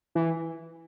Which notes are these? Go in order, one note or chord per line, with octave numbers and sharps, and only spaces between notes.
E3